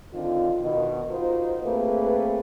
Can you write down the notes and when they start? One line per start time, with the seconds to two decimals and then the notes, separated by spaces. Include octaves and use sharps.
0.13 D3 D#3 C4 F4
0.62 B2 D#3
1.09 D#4 F4 F#4 A#4 C5
1.64 A3 A#3 C4 G#4 B4